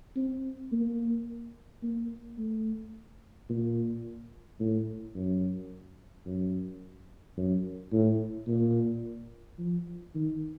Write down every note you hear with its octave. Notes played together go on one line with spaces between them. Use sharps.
C4
A#3
A#3
A3
A#2
A2
F#2
F#2
F#2
A2
A#2
F3
D#3